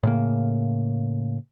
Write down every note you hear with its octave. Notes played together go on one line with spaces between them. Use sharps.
A2 C#3 A#3